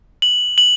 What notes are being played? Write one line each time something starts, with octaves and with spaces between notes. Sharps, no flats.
F#7
F#7